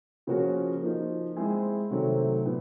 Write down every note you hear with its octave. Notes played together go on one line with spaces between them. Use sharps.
C#3 F3 A#3 C#4 F#4
F3 A#3 D#4
G#3 C4 E4 G#4
C3 D#3 F#3 A3 C4
A#2 B3